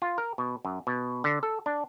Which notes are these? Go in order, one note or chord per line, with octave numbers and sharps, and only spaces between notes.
F4
A#4
B2
F#2
B2
D3
A4
D4